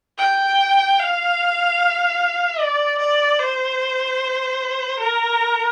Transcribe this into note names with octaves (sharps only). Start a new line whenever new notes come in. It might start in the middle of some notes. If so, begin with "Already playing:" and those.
G5
F5
D5
D5
C5
A#4